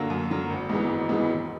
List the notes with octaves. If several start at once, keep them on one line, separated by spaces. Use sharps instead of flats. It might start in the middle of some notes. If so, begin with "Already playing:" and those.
Already playing: F#2 D3 F#3 A#3
F#2
D3 F#3 A#3
G#1
G#2 E3 G#3 B3
G#1
G#2 E3 G#3 B3
E1